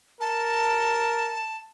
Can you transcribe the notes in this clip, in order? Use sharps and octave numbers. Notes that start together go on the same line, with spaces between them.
A#4 A5